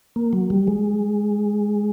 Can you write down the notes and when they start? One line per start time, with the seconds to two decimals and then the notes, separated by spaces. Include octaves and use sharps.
0.16 A#3
0.33 F#3
0.50 G3
0.68 G#3